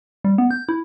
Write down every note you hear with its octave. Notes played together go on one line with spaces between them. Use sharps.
G3
B3
G6
E4